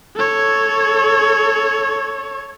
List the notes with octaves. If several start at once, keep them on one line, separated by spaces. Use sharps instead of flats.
A4 C#5